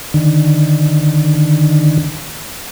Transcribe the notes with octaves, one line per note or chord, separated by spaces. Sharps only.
D3 D#3